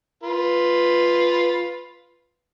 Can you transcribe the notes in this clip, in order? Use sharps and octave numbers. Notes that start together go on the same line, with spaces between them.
F4 B4